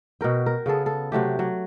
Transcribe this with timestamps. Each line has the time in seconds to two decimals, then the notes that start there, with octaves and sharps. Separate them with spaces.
0.21 B2 F#4 A#4 G5
0.46 A#4
0.66 C#3 B3 G#4 A4
0.86 A4
1.12 C3 F#3 A3 G4
1.39 F#3